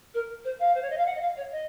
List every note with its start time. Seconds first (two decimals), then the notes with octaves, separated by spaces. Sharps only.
0.14 A#4
0.44 C5
0.59 F5
0.74 C5
0.82 C#5
0.90 D#5
0.97 F5
1.06 F#5
1.15 D#5
1.21 F5
1.36 C#5
1.51 D#5